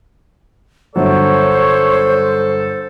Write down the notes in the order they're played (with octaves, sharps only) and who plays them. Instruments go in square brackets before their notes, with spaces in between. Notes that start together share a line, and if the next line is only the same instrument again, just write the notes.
[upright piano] G1 F#3 [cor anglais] A4 [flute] C5 [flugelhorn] C#5